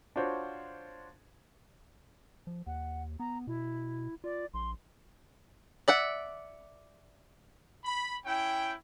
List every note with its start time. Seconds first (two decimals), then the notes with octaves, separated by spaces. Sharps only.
0.16 D4 F4 F#4 C5 C#5
2.47 F3
2.67 D#2 F#5
3.20 B3 A#5
3.47 B2 E4
4.24 F4 D5
4.54 A#1 C6
5.88 D5 E5 F#5
7.84 B5
8.25 C#4 E4 G5